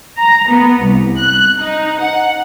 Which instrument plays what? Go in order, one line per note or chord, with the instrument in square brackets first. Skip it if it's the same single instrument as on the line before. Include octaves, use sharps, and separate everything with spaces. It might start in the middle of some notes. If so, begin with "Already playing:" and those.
[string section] A#5
B3
C2
F#6
D#4
F#5